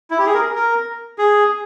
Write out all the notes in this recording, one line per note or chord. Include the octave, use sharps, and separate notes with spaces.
E4
G4
G#4
A#4
A#4
G#4